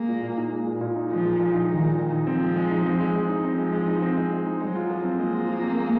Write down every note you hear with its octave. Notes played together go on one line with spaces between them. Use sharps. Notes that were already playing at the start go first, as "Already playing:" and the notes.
Already playing: G#3 A#3
A#2
A#2
D#4
G#3
A#2
A#2
D#4
F3 G#3
A#2
A#2
D#4
D#3 G#3
A#2
A#2
D#4
F3 C4
G#3
G#3
D#4
C4
G#3
G#3
D#4
F3 C4
G#3
G#3
D#4
C4
G#3
G#3
D#4
F#3 G#3
F4
F3
C4
G#3 A#3
F4
F3
C4
G#3